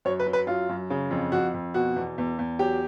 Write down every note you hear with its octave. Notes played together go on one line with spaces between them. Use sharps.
F#2 C#5
B4
F#3
B4
F#2 F4
F#2
C#3
F2
F2 F#4
F2
B2 F#4
E2
E2
E2
F#3 G4